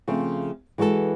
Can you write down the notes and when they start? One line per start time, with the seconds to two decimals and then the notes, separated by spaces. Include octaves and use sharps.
0.08 C#3 F3 A3 C4
0.78 E3 G#3 F#4 G4 A4